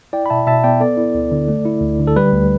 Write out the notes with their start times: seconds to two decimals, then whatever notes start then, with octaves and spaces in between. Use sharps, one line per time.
0.13 E4 D5 G5
0.26 B5
0.30 B2 E5 A5
0.47 B2 E5 A5
0.64 B3 D5 G5
0.80 B3 A4 D5
0.97 E4
1.14 D2
1.31 D3
1.48 A3
1.65 E4
1.82 D2
1.99 D3
2.07 A4
2.16 G3 B4
2.33 D2